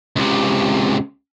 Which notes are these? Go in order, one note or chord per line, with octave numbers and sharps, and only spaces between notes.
C#2 C3